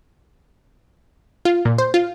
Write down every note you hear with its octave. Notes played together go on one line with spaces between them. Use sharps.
F4
A#2
C5
F4